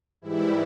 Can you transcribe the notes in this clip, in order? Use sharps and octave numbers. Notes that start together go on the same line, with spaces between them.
G#2 E3 G3 E4